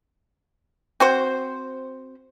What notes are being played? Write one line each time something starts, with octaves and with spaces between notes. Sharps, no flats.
C4 F#4 C5